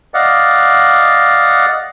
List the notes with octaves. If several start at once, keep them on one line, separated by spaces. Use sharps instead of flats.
D5 D#5 F5 F#5